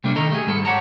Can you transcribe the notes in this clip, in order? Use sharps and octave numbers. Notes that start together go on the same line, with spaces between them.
C3 G3 A3 A#3 D4
D#3 A4 D#5 A#5
A3 G4 G#4
G#2 G3 A4
G4 C#5 E5 F#5 A5 A#5